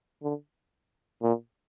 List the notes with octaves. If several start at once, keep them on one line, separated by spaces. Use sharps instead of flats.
D3
A#2